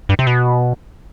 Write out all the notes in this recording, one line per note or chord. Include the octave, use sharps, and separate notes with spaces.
G2
C3
B2